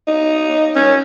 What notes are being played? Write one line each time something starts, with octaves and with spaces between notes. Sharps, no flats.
D#4
C#4